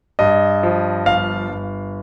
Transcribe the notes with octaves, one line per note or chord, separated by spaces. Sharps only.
G2 D#5
F3
G1 F5
G1